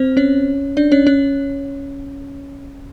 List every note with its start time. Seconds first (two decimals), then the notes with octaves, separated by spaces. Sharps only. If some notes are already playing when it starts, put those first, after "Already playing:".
Already playing: C4 C5
0.17 C#4 C#5
0.77 D4 D5
0.92 C#4 C#5
1.07 C#4 C#5